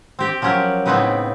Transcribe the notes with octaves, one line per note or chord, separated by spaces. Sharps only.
C4 G4 G5
F3 F#3 C#4 G4 A#4
A2 C#3 B3 C4 D#4 B4